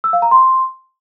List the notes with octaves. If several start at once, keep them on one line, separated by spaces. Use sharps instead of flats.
E6
F5
A#5
C6